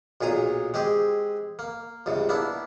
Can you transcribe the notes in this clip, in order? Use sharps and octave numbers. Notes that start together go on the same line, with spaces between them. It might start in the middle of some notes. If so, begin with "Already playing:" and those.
B1 A#2 G#4 A#5 D#6
G#3 C4 G4 G#4
A#3
C#2 G2 C3
A#3 B3 D4 E4